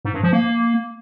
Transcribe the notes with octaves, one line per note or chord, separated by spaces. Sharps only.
G#2
G2
F3
A#3